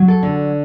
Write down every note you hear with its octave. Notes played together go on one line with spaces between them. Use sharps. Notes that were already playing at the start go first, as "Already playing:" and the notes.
Already playing: F#3
A4
D3